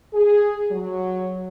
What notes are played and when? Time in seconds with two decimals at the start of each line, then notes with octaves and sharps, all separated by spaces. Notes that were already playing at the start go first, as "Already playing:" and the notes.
0.14 G#4
0.71 F#3